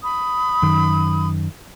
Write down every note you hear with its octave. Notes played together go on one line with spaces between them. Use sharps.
B5 D#6
F#2 D#3